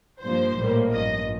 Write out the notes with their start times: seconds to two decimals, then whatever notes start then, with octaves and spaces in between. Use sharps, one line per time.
0.21 G2 F3 A#3 C5
0.57 A#1 A2 G3 A#3
0.92 A1 G2 F3 D#5